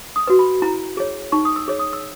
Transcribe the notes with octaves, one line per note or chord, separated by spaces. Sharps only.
D#6
F#4 B4
B5
E4 A#5
G#4 C#5
D#4 C#6
D#6
E6
G#4 C#5
D#6
E6